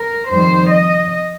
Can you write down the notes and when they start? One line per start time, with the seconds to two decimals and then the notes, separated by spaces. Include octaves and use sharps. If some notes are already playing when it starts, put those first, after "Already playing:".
Already playing: A#4
0.30 F2 D#3 G3 C5
0.70 D#5